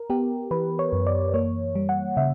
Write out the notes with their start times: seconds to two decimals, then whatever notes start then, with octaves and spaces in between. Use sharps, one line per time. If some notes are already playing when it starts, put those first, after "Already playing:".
Already playing: A#4
0.10 B3 G4
0.51 E3 B4
0.79 C#5
0.92 F#2
1.07 D5
1.34 A#3 C#5
1.75 G3
1.89 F#5
2.17 C#3 E5